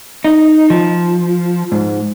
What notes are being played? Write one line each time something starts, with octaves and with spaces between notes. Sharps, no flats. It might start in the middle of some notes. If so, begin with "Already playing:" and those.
D#4
F3
G#2